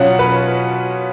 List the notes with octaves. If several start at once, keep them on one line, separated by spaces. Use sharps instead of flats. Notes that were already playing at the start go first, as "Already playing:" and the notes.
Already playing: B2 F#3 C#4 F4 F#5
B4